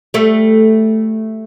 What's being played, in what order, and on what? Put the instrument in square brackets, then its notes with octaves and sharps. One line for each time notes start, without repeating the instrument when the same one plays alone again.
[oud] G3 A3